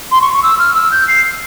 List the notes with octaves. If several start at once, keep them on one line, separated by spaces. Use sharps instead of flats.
C6
C#6
C#6
E6
F6
E6
G6
C7